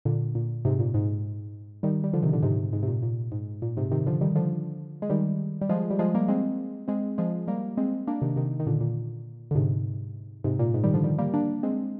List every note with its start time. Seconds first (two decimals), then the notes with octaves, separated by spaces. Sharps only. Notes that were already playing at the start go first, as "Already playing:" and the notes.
0.05 A#2 D3
0.35 A#2
0.65 G#2 C3
0.80 A#2
0.94 G#2
1.83 D#3 G3
2.04 G3
2.13 D3 F3
2.23 C3 D#3
2.33 A#2 D3
2.43 G#2 C3
2.73 G#2
2.83 C3
2.88 A#2
3.03 A#2
3.32 G#2
3.62 A#2
3.77 G#2 C3
3.91 C3 D#3
4.06 D3 F3
4.21 D#3 G3
4.36 D3 F3
5.02 G#3
5.10 D#3 G3
5.61 G3
5.69 F3 G#3
5.91 G3
5.99 F3 G#3
6.14 G3 A#3
6.28 G#3 C4
6.88 G#3 C4
7.18 F3 G#3
7.48 G3 A#3
7.77 G#3 C4
8.07 A#3 D4
8.22 C3 D#3
8.36 C3 D#3
8.60 D#3
8.67 A#2 D3
8.81 A#2
9.51 D3
9.55 G#2 C3
10.44 G#2 C3
10.59 A#2
10.74 G#2
10.84 D#3 G3
10.94 D3 F3
11.04 D#3 G3
11.18 G3 A#3
11.34 A#3 D4
11.63 G#3 C4